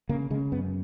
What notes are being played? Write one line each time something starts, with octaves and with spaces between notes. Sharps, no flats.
C#3 A#3
C#3 G#3
F#2 B3